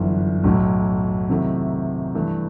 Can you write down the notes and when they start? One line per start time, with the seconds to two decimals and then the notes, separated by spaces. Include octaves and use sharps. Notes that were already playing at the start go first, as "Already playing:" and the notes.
Already playing: G1 F#2 E3
0.44 B1 A2 F#3
1.29 C3 D#3 F#3 A3 E4
2.15 G2 E3 A3